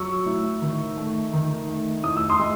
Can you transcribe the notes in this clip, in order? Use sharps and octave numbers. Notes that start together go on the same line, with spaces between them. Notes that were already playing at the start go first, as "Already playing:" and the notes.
Already playing: F#3 C#6 E6
A2
D#3
A3
D#3
A3
A2 D#6
E6
C6 D#6
G#3